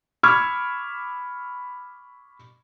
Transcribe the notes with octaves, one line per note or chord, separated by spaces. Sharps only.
B5 C#6 D6 E6 F6 G#6